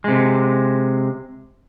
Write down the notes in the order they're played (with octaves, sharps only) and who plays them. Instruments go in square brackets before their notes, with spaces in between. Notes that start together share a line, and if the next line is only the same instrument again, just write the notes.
[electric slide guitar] C3 G#3